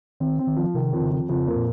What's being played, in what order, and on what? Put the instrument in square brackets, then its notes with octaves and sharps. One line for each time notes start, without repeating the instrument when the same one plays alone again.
[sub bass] D#3 [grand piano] C4
[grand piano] C4
[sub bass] D#3
[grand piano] F3
[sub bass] C3 [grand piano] D#3
[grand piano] F2
[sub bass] C#3
[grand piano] F2
[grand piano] F2 [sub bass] C#3
[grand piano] A#3
[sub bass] A#2